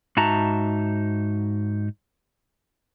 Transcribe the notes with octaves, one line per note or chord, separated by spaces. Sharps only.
G#2 D#4 F#4 E5 A5 A#5